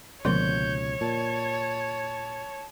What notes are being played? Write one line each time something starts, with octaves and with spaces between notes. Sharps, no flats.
C#2 B2 D3 F3 A#3 C#5 C6 G6
A#2 A5